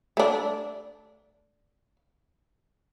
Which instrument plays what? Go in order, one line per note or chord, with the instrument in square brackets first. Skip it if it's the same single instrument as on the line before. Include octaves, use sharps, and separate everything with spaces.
[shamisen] A3 D4